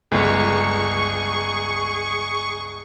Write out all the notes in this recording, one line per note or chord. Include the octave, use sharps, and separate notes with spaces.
G1 C#2 G#4 C#6